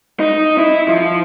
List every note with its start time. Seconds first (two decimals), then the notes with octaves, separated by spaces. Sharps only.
0.20 D#4
0.58 E4
0.88 F3